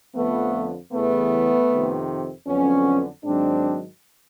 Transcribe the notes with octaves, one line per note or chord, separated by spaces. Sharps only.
F2 D3 F3 A3 B3
E2 C#3 E3 A3 B3
F2 C3 D#3
F2 D3 F#3 B3 C#4
G#2 D#3 F#3 C4 D4